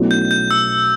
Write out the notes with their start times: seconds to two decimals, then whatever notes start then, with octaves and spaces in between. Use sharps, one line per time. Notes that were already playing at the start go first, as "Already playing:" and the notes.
Already playing: B1 B2 A3 C#4 E4
0.11 G6
0.31 G6
0.51 E6